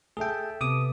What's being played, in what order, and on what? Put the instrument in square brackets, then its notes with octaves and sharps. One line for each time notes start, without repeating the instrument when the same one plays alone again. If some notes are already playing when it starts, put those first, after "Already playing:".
[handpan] A3 A4 E5 [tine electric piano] G#4 G5
[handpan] C3 B3 [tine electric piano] D6 D#6